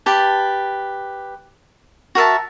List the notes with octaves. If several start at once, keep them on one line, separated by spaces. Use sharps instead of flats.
G4 B4 A5
F#4 A#4 E5 A5